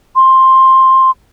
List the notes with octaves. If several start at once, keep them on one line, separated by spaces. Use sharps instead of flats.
C6